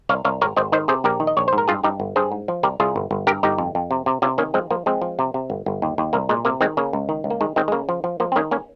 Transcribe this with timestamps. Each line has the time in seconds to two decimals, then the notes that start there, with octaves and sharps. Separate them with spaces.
0.09 C2 C#5 F5
0.25 C2 C#5 F5
0.41 G#1 A#4 C#5
0.57 G#1 C5 D#5
0.72 D#3 C5 D#5
0.88 C3 G#4 C5
1.04 A#1 G4 A#4
1.20 D#3
1.27 D#5
1.37 A#1 C#5
1.48 G#2 C5
1.58 A#4
1.68 G2 F4 G#4
1.84 G2 D#4 G4
2.00 G1
2.16 G2 G#4 C5
2.32 G#2
2.48 F3
2.63 C2 G4 A#4
2.80 C2 F4 G#4
2.96 G1
3.11 G1
3.27 G2 G4 A#4
3.43 G1 D#4 G4
3.58 F2
3.75 F2
3.91 C3
4.06 C3
4.22 C3 C#4 F4
4.38 D#3 A#3 C#4
4.54 F3 G#3 C4
4.70 F3 A#3
4.86 F3 G#3 C4
5.02 F3
5.19 C3
5.34 C3
5.50 G1
5.66 G1
5.82 D#2
5.98 D#2
6.13 C2 A#3
6.29 A#2 G#3
6.45 C3 A#3
6.61 D#3 G#3 C4
6.77 C#3 A#3 C#4
6.93 C#2
7.09 D#3
7.24 C#2
7.30 A#3
7.41 D#3 G#3
7.56 D#3 G#3 C4
7.68 G#3
7.72 C#3 A#3
7.89 F3
8.04 F3
8.20 F3 A#3
8.32 C4
8.36 D#3 A#3 C#4
8.51 A#3 C#4